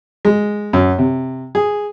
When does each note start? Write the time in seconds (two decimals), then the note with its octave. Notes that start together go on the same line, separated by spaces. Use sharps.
0.25 G#3
0.73 F#2
0.99 C3
1.55 G#4